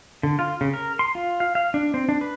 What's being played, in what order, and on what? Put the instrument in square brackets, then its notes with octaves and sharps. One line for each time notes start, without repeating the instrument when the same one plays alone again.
[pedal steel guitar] D3
F4
C#3
A#4
C6
F4
F5
F5
D4
C4
D4
B4